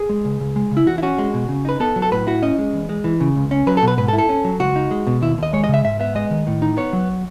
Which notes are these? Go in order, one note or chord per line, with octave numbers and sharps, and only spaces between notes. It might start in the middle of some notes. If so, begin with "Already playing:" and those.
Already playing: G#4
G#3
C#2
C#2
G#3
C#3
E4
E2 F#4
E4
C#4 F#4
G#3
B2
C#3
D#4 B4
B3 A4
F#3
A4
A2 B4
E4 F#4
C#4 D#5
G#3
E2
G#3
E3
C#3
C#2
C#4
F#3 B4
A4
B2
B4
G#2 B4
A4
E4
A4
C#4
F#3
C#2 F#4
D#4
G#3
B2
D#2 E4
D#2 D#5
G#3 C#5
D#5
C#3
E5
G#2 E5
B3 E5
G#3 D#5
D#3
A2
D#4
B3 C#5
F#3